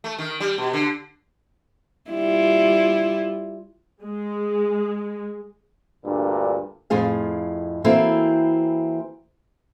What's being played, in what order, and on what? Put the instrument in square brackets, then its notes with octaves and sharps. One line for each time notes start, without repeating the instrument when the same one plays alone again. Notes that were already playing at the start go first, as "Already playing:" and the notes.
[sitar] A3
D#3
G3
B2
D3
[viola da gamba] G3 E4 F4
[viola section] G#3
[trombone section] D2 G2 A#2
[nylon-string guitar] F2 A2 F4 G#4 F5
E3 A#3 C4 E4 F#4 A4